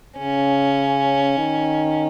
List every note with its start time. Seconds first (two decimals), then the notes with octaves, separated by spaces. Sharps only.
0.18 C#3 C#4
1.38 D#3